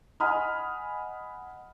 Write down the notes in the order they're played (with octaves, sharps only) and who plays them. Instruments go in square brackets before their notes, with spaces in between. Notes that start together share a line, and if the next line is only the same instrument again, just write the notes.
[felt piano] D#5 F#5 G#5 B5 D#6 F6